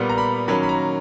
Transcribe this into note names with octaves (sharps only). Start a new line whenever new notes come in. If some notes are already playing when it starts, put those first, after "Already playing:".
Already playing: A#2 G3 B3
A#5
B5
D#3 F#3 A#3 C#4 B5
B5
A#5